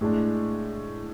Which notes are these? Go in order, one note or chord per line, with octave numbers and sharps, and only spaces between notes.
A2 G#3 D4